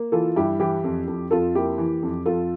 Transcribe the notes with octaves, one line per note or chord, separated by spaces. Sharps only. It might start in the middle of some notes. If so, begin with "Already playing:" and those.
Already playing: A#3
E3 F4 A4
G2 E4 G4
E3 E4 G4
F2
F2
F2 F4 A4
A#3 E4 G4
E3
F2
F2 F4 A4